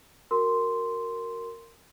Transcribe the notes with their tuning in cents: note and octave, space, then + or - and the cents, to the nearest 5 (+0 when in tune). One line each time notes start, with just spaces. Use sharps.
F#4 +0 A#4 -15 C6 -5